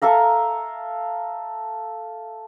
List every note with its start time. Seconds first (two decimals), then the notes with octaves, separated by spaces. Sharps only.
0.02 A4 E5 F5 A#5